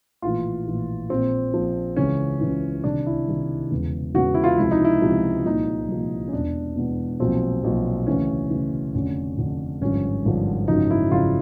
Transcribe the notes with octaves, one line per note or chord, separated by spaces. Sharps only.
A#1 A2 E3 F4
A#1 A2 E3
A#1 A#2 F3 C4
A#1 A#2 F3
C#2 C#3 E3 C#4
C#2 C#3 E3
C2 C3 D#3 D4
E4
C2 C3 D#3
E1 E2 C#3 E3
E1 E2 C#3 E3 F#4
E4
F4
C#2 C3 F3 E4
D#4
E4
C#2 C3 F3
C2 A#2 F3 D#4
C2 A#2 F3
C#4
E1 E2 B2 D4
E1 E2 B2
B1 A#2 F3 C4
B1 A#2 F3
D2 C#3 E3 C#4
D2 C#3 E3
F1 F2 D3 C#4
F1 F2 D3
G#1 G2 D3 F3 C#4
G#1 G2 D3 F3
G#1 F#2 C#3 F3 D#4
E4
G#1 F#2 C#3 F3 F4